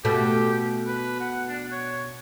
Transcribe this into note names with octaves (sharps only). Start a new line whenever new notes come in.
B2 A3 G4
B4
F#5
D4
C#5